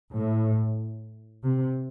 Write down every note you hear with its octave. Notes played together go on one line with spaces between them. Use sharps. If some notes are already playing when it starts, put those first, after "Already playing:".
A2
C3